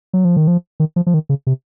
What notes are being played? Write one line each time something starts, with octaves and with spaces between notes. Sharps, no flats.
F#3
F3
D#3
F3
D#3
F3
F3
D#3
C#3
C3